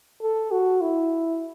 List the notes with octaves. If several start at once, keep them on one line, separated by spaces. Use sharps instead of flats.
A4
F#4
E4